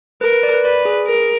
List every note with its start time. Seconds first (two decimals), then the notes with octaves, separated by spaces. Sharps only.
0.21 A#4 B4
0.32 B4
0.43 D5
0.54 B4
0.64 B4 D5
0.85 G#4
1.07 A#4